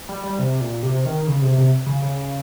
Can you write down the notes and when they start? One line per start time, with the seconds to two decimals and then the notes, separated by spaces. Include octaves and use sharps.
0.09 G3
0.24 G3
0.39 C3
0.61 A#2
0.83 C3
1.05 D#3
1.27 C#3
1.42 C3
1.58 C3
1.86 C#3
2.02 C#3